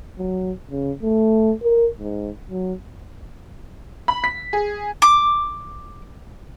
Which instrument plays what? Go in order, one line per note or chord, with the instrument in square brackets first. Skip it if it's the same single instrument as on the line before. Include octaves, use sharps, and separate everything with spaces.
[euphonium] F#3
C#3
A3
A#4
G#2
F#3
[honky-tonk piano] B5
B6
G#4
[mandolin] D6